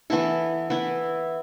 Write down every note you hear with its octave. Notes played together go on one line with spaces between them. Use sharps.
E3 B3 E4 A4
E3 B3 E4